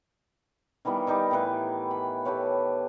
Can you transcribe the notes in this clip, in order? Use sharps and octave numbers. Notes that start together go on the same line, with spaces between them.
D#3 E3 G3 B3
D#3 G3 D#4 G4
A2 D#3 E3 B4
B5
G4 A4 B4 C#5